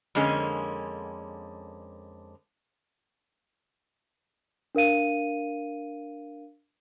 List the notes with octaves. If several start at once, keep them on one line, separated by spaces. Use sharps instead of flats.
F2 D3 G#3 A#3 C#4
D4 A#4 F5 D#7